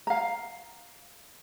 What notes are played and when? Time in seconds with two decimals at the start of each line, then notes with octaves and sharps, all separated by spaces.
0.07 F5 A#5